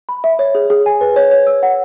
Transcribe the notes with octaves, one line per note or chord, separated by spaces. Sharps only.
B5
E5
C#5
G#4
G#4
G#5
B4
C#5
C#5
E6
F#5